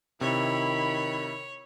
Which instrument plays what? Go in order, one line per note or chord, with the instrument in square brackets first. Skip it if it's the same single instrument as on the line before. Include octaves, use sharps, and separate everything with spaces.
[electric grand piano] C3 [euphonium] D#3 [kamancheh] E4 B5 [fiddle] C#5